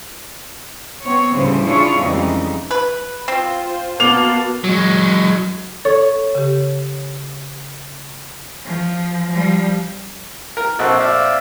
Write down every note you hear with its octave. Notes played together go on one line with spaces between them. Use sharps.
B3 C4 C#5
D2 A2 C#3 E3 G3 C5
C#4 D4 E4 F4 G#4 C#5
F2 C#3 E3 G3 G#3 D#4
B4
C4 F4 C5
A#3 B3 F#4 A5 F7
F#3 G#3
A4 C#5
C#3 G4
F3
F3 G3
A#4
A#1 C4 F#4 A4 F#6
D5 E5 F5